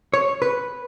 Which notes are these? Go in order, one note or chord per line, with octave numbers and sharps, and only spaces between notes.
C#5
B4